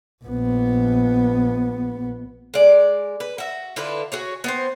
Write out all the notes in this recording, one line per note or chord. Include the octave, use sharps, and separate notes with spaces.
A#1 B3
G#3 D5
B4
F#4 E5
D3 E4 F4 B4
F#4 G#4 C#5
B3 C4 C5